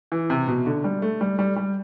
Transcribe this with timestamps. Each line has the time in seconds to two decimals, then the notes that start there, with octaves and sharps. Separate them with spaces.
0.12 E3
0.30 C3
0.48 B2
0.66 D3
0.84 G3
1.02 A3
1.21 G3
1.39 G3
1.56 G3